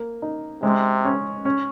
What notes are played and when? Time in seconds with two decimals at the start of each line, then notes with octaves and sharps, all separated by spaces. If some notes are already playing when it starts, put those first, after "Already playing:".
Already playing: A#3
0.22 D#4
0.63 C3 G#3
1.05 C#4
1.45 C#4